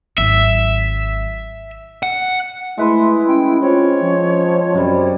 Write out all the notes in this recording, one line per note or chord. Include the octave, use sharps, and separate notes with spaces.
G#1 F#3 E5
F#5
G#3 A3 E4 B4 E5 C6
C#4 G5
C4 F4 C#5
F3
F#2 C3 G3